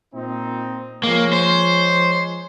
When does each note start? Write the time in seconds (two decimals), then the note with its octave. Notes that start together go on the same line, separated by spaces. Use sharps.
0.14 A#2 C4 D#4
1.03 F3 G#3 A#3 C#5
1.33 C5